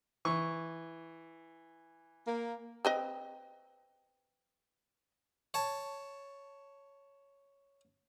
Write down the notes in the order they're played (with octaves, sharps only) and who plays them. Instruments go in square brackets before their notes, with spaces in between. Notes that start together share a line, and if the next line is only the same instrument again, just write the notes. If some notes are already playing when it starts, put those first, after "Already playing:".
[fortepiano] E3 C#6
[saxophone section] A#3
[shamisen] C4 B4 D#5
[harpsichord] C#5 A5